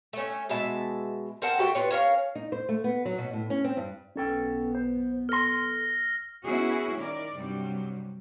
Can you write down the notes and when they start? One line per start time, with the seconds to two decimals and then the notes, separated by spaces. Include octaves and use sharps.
0.13 A3 C#4
0.49 B2 G#3 E5 A5
1.42 C4 A#4 F#5 A5
1.59 A3 F#4 G4
1.75 F4 B4 C#5
1.90 C#4 A#4 C#5 F5
2.35 D#4
2.52 C5
2.69 A3
2.84 B3
3.05 F#3
3.18 B2
3.33 A2
3.50 C#4
3.64 C4
3.77 G2
4.16 B1 B3 C#4 A4 G5
4.75 C5
5.29 A4 C6 F6 A#6
6.44 B3 C#4 E4 F#4 G#4
6.96 D#3 A#4 D5
7.37 G2 C3 F#3 G3